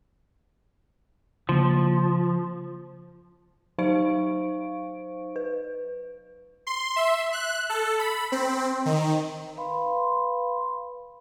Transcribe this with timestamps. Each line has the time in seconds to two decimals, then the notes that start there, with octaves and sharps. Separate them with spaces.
1.49 C#3 F3 A#3
3.78 F#3 D#4 C5 F5 C#6 D7
5.36 B4
6.67 C6
6.96 E5
7.33 F#6
7.70 A4
7.99 B5
8.32 C4
8.85 D#3
9.57 B4 F5 B5 C6